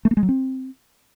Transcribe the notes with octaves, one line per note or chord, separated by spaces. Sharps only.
A3
A#3
G#3
F#3
C4